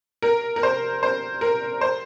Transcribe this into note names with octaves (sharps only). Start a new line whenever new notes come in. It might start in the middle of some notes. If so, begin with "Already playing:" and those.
A#4
A#4
C5
C5
A#4
C5